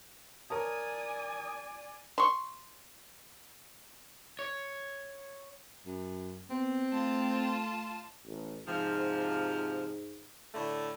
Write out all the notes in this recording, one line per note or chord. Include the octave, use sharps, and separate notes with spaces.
A#4 C#5 D5 G#5 A5 D#6
C6 C#6
C#5
F#2
B3 C4
A3 F4 A5
A1
G#2 C3 F3
A2 D3 A3